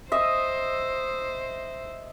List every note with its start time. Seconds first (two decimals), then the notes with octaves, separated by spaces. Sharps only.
0.12 C5 D#5 E5